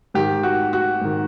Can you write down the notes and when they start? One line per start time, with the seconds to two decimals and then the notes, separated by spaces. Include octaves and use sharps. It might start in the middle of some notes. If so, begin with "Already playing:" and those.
0.14 G#2 D#3 G4
0.43 F#4
0.73 F#4
1.01 G#2 D#3